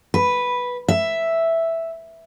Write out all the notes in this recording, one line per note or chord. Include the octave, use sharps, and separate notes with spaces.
B4
E5